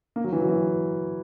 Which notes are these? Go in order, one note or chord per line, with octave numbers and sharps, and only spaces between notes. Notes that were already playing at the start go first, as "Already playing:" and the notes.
A#3
F#3
E3
F#3
E3